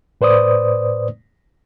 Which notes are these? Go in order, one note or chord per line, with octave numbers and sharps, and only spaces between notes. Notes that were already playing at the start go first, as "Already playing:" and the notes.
A2 B4 C5 D5 D#6